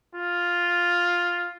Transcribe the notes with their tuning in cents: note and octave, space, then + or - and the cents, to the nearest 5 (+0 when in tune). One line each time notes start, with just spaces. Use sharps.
F4 +5